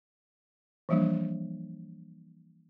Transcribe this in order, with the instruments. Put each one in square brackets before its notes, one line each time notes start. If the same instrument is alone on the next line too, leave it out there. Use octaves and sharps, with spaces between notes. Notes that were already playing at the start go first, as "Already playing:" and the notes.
[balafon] E3 F3 G3 A#3 D4